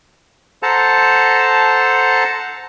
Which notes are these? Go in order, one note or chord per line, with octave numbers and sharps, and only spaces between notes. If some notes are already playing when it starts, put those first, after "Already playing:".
A4 C5 F#5 A5 A#5